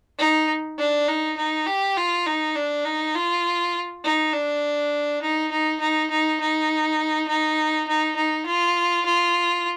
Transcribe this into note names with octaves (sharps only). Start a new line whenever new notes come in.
D#4
D4
D#4
D#4
G4
F4
D#4
D4
D#4
F4
D#4
D4
D#4
D#4
D#4
D#4
D#4
D#4
D#4
D#4
F4
F4